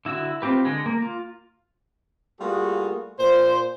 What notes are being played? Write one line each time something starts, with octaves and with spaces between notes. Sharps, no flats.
D3 E4 F#4 E6
C4 F4 G4 B4
D3 G#3
A#3
F4
G3 A3 A#3 F4 F#4 G#4
A#2 C5